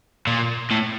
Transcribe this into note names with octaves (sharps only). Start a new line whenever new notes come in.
A#2
A2